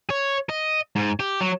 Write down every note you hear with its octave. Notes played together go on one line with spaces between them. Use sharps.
C#5
D#5
G#2
G4
F#3